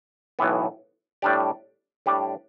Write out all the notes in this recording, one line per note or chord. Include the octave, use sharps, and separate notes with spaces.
B1 A2 E3 B3
A2 G3 D4 G4 D5
A2 G3 D4 G4 D5